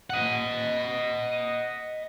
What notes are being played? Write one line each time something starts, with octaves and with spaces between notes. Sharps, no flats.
D#5 F#5